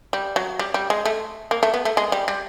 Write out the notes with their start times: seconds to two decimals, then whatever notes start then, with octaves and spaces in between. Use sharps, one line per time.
0.13 G3
0.36 F#3
0.59 G3
0.74 G3
0.90 G#3
1.05 A3
1.51 A#3
1.63 A3
1.74 B3
1.85 A3
1.97 G#3
2.12 G3
2.28 G3